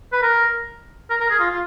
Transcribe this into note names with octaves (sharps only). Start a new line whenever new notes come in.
B4
A#4
A#4
A#4
G#4
F4
F4